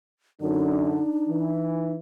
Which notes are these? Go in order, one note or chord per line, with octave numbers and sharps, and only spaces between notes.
F#2 D3 D4 D#4
E3